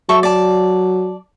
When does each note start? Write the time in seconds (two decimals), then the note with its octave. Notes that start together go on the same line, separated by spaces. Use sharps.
0.09 F#3 A4 E5 C#6
0.23 D5 A5